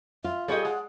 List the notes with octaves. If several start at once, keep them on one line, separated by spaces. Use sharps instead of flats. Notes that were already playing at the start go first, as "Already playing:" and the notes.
F4 E5
G3 G#4 A4 C#5 D#5 G5
G#3 F#5